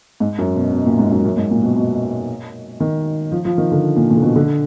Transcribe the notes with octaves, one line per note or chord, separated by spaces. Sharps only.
G#2
F#2
B2
B2
A#2
G#2
F#2
F#2
G#2
A#2
B2
B2
D#3
F3
F3
D#3
D3
A#2
A#2
D3
B2
D3